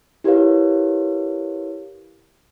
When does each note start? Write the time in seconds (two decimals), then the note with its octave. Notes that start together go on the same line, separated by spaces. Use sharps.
0.24 E4 G4 A#4 B4 C#5 F5